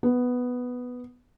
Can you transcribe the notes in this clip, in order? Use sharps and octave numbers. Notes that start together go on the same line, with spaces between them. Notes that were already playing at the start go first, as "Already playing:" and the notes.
B3